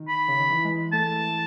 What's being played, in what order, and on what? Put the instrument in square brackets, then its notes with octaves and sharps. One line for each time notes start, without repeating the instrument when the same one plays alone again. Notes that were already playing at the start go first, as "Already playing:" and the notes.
Already playing: [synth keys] D#3
[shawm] B5
[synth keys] C#3
D#3
E3
G#3
G#3
[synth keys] A3 [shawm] A5